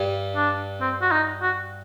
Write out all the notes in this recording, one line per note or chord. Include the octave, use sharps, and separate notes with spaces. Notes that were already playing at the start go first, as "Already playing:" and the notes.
Already playing: G2 G3
D4
C4
F#4
D#4
F#4